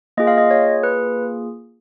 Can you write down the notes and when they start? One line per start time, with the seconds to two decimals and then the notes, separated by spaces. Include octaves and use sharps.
0.17 A#3 F4 G#4 D#5
0.27 F5
0.38 D#5
0.51 C#5
0.83 B4